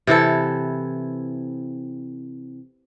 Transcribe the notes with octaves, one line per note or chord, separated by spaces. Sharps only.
C3 E3 E4 A4